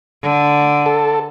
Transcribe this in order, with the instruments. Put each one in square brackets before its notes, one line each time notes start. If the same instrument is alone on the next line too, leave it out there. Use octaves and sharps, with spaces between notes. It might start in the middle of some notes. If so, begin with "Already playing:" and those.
[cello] D3
[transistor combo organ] A4